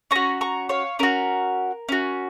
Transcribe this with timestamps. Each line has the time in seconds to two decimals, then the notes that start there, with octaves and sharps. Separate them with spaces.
0.11 C#4 F#4 A#5 C#6
0.41 A#5 C#6
0.69 C#5 F5
0.99 C#4 F#4 A#4
1.89 C#4 F#4